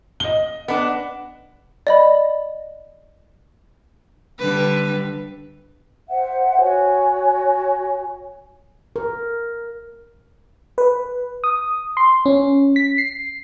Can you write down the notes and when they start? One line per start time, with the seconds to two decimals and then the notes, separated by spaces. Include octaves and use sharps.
0.20 D#5 G7
0.68 B3 D4
1.87 D5 D#5 B5
4.39 D3 G3 B4
6.09 C5 E5 F#5
6.60 F#4 C#5 G#5
8.96 A#4
10.78 B4
11.44 D#6
11.97 C6
12.26 C#4
12.76 B6
12.98 C7